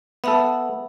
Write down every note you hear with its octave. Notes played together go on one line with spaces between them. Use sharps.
B3 A4 E5 F#5 B5